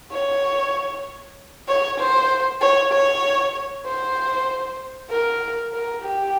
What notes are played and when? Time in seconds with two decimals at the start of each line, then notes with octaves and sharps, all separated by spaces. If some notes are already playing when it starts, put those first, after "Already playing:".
0.12 C#5
1.68 C#5
1.99 C5
2.61 C#5
2.92 C#5
3.86 C5
5.10 A#4
5.73 A#4
6.03 G4